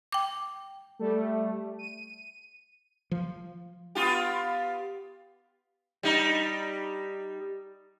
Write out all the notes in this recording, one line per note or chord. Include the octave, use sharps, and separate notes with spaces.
G5 D6
G3 A3
D#7
F3
B3 F4 G4
G3 D#4